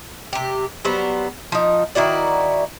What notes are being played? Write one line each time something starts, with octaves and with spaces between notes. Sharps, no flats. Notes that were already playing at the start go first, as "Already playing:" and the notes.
C3 G4
F#3 G3 B3 C5
F3 D#4
D#3 E4 F#4 D5